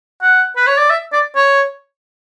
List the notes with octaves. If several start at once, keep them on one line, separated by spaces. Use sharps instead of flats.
F#5
B4
C#5
D5
E5
D5
C#5